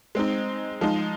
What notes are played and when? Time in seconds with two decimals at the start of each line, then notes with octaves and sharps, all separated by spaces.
0.15 G#3 C4 D#4
0.81 F3 G#3 D#4